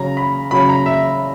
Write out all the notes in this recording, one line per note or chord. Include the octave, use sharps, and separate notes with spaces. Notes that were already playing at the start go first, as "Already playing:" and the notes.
Already playing: C#3 F#3 C#4 A#5
B5
C#3 F#3 C#4 B5
A#5
E5